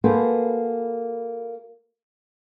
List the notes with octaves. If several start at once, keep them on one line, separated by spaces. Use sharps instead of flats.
A#3 F#4 G#4 A4 B4 C5